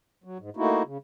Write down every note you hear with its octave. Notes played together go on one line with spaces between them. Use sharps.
F#3
G#2
A3 A#3 D#4 E4 F#4
C#3